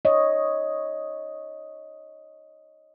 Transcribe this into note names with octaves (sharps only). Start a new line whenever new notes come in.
C#5 D#5